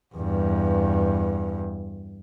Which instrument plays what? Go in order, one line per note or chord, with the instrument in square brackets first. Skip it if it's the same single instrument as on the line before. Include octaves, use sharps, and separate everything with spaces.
[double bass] E2 G2